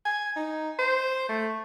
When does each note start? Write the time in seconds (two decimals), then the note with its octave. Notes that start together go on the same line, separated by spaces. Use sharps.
0.05 G#5
0.36 D#4
0.79 C5
1.28 A3